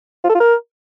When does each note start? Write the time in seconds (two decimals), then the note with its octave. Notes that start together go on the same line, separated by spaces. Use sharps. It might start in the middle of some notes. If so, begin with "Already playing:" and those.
0.24 F4
0.30 A4
0.35 F4
0.40 A#4